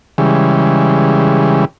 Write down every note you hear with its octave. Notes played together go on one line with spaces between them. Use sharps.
C#3 E3 G3 G#3